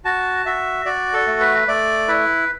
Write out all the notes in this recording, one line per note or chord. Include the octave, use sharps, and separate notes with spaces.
F#4 A5
F#4 E5
F#4 D5
A4
A3
B4
A3 D5
E4 B4